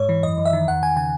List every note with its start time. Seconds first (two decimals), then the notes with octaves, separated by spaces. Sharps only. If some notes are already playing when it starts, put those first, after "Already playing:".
Already playing: G#2 C#5
0.09 E3
0.23 F#2 D#5
0.38 F#2
0.45 E5
0.53 D#3
0.67 E2 F#5
0.82 E2 G#5
0.97 C#3 G#5